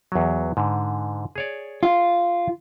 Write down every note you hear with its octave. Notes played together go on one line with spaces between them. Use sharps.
E2 F#3
G#2 D3
G#4 C#5 D5
F4